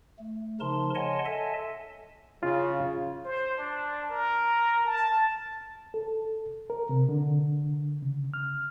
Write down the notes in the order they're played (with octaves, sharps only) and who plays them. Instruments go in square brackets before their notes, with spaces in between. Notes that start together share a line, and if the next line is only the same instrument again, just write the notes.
[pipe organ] A3
C#3 F3 D#4 A#4 A5 C6
C#5 D#5 F#5 G#5 A5 C6
A4 D#5 E5 G#5 A5
[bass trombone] C#3 [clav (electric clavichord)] F4
[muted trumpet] C5
D4
A#4
A5
[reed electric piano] A4
A#4
C3
D3
C#3
F6